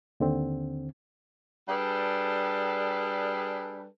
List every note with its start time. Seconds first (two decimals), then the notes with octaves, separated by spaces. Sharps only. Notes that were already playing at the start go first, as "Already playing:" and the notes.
0.20 D#2 D3 C4
1.68 G3 D4 G#4 A4 B4